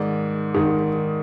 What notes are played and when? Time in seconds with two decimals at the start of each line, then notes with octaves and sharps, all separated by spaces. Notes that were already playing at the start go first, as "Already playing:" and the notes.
Already playing: G#2 D#3 D5
0.55 G#2 D#3